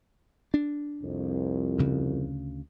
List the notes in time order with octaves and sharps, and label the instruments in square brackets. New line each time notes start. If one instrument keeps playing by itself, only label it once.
[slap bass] D4
[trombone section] C2 F2
[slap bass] D2 C#3